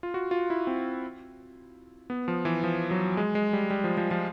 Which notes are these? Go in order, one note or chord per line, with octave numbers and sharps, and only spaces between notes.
F4
F#4
F4
E4
C4
B3
F3
E3
F3
F#3
G#3
G#3
G3
G3
F3
F3
F3